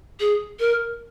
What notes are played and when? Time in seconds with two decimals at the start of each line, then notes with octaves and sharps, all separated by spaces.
0.20 G#4
0.60 A#4